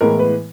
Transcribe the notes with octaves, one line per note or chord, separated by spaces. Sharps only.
A2 E3 G#3 B3 A#4
B4